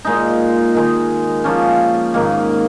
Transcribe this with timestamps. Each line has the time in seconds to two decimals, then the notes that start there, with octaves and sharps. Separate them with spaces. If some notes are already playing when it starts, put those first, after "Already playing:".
0.05 A#2 G#3 D#4
0.75 D#3 G#3 D#4
1.44 F3 A#3 C#4
2.14 G#2 D#3 A#3